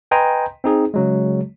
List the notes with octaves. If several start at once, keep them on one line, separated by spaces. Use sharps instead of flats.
B4 D#5 G5 G#5 A#5 C6
C4 D#4 G#4
C#3 F#3 G#3